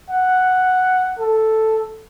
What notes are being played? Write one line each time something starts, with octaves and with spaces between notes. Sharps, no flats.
F#5
A4